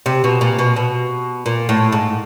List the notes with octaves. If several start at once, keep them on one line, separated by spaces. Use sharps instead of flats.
C3
B2
A#2
B2
B2
A#2
A2
G#2